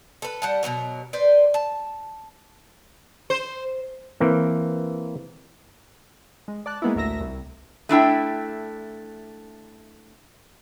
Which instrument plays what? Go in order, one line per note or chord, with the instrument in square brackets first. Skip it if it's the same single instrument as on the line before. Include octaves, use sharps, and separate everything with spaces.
[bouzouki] A4 B4
G3 F#5 A5
B2 D#3 F#3 A#4
B4 C5 D5
A5
[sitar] C5
[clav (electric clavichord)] E3 A#3 C4
[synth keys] G#3
D5 A5 F#6
G#3 A#3 B3 D#4 E4
A1 D2 A#4 E5 A#6
C2
[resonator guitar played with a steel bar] A3 D4 E4 G5